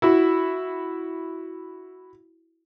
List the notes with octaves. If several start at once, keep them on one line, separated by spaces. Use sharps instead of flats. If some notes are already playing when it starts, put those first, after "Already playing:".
E4 F#4